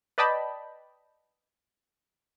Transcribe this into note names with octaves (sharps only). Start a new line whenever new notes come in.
B4 D5 D#5 G5 A5 B5